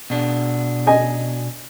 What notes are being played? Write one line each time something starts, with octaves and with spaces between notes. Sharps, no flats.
B2 D4
D#5 G#5